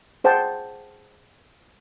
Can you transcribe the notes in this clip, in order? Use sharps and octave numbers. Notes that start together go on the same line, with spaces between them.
G#4 C5 F#5 G5 A5